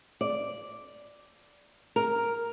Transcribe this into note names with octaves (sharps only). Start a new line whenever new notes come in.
D5
A#4